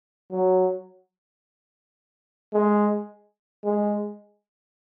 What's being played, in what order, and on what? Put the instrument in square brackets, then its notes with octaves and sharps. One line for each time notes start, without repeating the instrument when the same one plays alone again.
[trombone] F#3
G#3
G#3